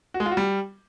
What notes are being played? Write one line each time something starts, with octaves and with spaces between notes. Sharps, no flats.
F#4
G#3
F4
F#4
G3